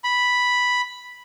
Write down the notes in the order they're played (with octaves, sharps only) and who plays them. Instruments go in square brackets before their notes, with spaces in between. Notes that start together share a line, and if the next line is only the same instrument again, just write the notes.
[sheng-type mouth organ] B5